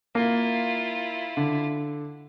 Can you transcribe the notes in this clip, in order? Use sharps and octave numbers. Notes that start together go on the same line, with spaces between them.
A#3 E4 F4
D3